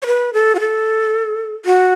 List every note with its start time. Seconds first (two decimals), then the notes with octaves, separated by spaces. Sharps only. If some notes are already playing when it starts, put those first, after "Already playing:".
0.02 C#5
0.06 B4
0.34 A4
0.55 F#4
0.60 A4
1.65 F#4